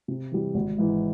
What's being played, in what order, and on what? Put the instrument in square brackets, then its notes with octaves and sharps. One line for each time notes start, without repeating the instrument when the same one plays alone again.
[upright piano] C3
E3 G3
G#1
G#2 E3